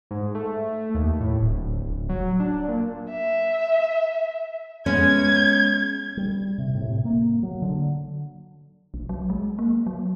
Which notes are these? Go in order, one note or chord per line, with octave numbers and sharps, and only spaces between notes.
G#2
A3
D#2
A2
D1
D1
F#3
D4
A#2
E5
G#3 B3 C#4 G#6
G3
C3
A2
C3
A#3
F#3
D3
B1
F#3
G#3
A#3
F#3